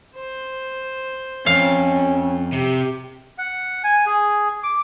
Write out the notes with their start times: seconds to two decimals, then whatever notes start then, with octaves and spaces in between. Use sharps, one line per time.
0.15 C5
1.46 F2 C#4 F5
2.53 C3 G4
3.38 F#5
3.84 G#5
4.06 G#4
4.63 D6